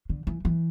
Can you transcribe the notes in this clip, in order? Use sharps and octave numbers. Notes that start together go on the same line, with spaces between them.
D3
E3
E3